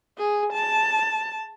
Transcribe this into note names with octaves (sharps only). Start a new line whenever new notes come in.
G#4
A5